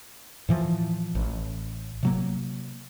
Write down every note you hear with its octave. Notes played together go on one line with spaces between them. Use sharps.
A2 E3 F3
A1
C3 F#3 A#3